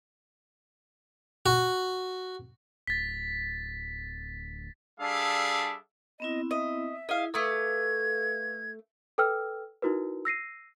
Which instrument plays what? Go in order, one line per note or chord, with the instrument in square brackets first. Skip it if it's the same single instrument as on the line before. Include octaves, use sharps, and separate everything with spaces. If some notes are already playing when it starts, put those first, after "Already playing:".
[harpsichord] F#4
[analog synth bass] D1 [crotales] A6 B6
[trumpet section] G3 D4 G#4 A4 E5 F5
[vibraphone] B3 C4 E4 [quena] D#5
[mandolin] D#5 [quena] E5
[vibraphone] E4 G#4 [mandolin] D#5 F5
[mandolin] A3 D6 D#6 [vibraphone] A4 B4 F5 [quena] G#6
[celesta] A4 B4 G5 E6 F6
D#4 E4 F#4 A#4 B4
E6 A#6 C7 D#7